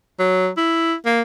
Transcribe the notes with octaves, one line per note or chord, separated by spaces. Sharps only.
F#3
E4
A#3